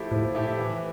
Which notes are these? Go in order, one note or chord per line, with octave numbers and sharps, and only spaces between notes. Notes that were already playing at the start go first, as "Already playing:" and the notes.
Already playing: F3 A3 E4 G4
A2 F3
A3 E4 G4
E3